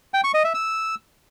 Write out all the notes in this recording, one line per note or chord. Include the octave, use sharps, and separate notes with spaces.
G5
C#6
D#5
E5
E6